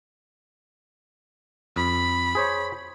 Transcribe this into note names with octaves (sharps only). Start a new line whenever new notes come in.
F2 B5
G#4 C5 C#5